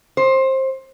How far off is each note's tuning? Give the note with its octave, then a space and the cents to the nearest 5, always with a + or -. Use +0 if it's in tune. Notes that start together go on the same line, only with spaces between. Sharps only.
C5 +20